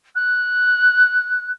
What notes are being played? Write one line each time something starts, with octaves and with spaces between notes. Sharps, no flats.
F#6